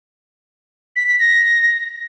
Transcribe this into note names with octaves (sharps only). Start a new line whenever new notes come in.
B6
B6
A#6